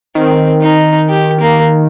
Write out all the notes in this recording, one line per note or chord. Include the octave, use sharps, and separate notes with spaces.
D#3 C4
D#4
G4
A#3